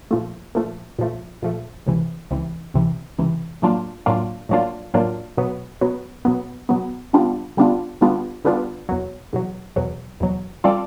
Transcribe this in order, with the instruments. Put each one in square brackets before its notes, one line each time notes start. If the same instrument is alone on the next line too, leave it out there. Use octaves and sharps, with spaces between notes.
[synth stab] A#2 F3 A3
A#2 F3 A3
A#2 F3 A3
A#2 F3 A3
C#2 C3 E3
C#2 C3 E3
C#2 C3 E3
C#2 C3 E3
A2 F#3 A#3 D4 F4
A2 F#3 A#3 D4 F4
A2 F#3 A#3 D4 F4
A2 F#3 A#3 D4 F4
B2 F#3 B3
B2 F#3 B3
B2 F#3 B3
B2 F#3 B3
D3 G3 B3 D4 F4
D3 G3 B3 D4 F4
D3 G3 B3 D4 F4
D3 G3 B3 D4 F4
E2 B2 F#3
E2 B2 F#3
E2 B2 F#3
E2 B2 F#3
G3 C4 F4 A4 D5